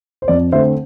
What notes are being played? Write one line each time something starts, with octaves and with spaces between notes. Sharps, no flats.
C5
F2 D5
D3 A3 C4 C5 E5